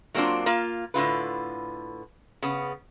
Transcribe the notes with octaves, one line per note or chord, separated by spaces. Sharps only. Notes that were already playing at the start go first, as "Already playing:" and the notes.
F#3 A#3 C4 D4 F4
A#3 F4 F5
A2 D3 F4 B4
C#3 B3